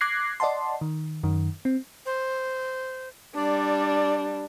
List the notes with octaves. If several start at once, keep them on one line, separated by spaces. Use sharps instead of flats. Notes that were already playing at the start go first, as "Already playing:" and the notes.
D6 F#6 G#6 A#6 C7
D5 D#5 F#5 A5 C6
D#3
F#2 D#3
C4
C5
G3 D4 D5